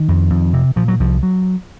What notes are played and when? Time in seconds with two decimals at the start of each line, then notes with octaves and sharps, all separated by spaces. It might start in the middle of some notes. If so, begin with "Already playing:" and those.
Already playing: D#3
0.08 F2
0.30 F2
0.53 C3
0.76 A#2 F3
0.88 F#3
1.00 C2 F3
1.23 F#3